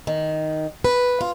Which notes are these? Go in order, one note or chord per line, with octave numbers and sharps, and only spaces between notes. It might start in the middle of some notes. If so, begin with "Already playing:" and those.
D#3
B4
F4